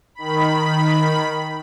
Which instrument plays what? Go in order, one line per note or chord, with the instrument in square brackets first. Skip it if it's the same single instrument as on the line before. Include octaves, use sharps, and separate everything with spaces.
[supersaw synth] D#3 B5